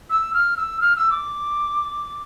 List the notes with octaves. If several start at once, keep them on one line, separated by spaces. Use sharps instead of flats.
E6
F6
E6
F6
E6
D6